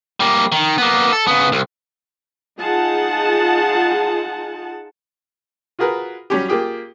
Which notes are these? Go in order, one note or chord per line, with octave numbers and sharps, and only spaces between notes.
G3 A#3
D#3
A#3 B3
A4
C#3 B3
C2
D#4 F4 G#4 F#5 A5
F4 F#4 G#4 A#4 B4
F#3 G3 C#4 G4
A#3 F4 G4 G#4